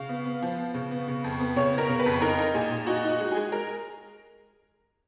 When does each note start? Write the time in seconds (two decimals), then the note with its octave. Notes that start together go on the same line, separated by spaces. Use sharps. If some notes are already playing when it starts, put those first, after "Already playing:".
Already playing: C#3 F5
0.09 B3
0.25 B3
0.42 F3
0.58 B3
0.74 C#3
0.91 B3
1.08 C#3
1.24 F2
1.39 B3
1.56 C#3 C#5
1.72 B3
1.78 A#4
1.89 C#3
1.99 B4
2.06 F2
2.22 D#4 A#4
2.38 D#4
2.54 A#2 G#4
2.70 A#2
2.87 D#4 F#4
3.04 D#4
3.09 F#4
3.20 G#3
3.31 G#4
3.37 G#3
3.52 G#3 A#4